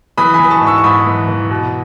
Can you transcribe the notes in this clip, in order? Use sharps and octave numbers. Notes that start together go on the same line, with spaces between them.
E3 B5 D#6
G#5 B5
E3 D#6
A5 C#6
G#2
C#6 E6
C#6
G#2 B5 D#6
E3
E3
B2